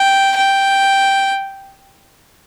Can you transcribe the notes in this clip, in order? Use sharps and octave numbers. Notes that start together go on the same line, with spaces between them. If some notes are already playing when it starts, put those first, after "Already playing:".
Already playing: G5
G5